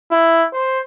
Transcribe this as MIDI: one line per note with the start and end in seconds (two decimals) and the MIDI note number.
0.11 0.46 64
0.53 0.80 72